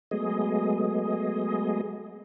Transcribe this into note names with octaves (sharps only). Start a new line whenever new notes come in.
F#3 G#3 A3 B3 G#4 D#5